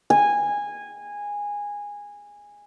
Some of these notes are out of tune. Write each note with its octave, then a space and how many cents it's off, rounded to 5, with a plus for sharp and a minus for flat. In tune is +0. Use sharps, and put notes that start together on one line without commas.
G#5 -15